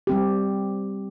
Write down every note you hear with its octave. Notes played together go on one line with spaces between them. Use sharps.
G3 C4 G4